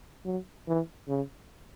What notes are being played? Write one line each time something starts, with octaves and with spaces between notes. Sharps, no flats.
F#3
E3
C#3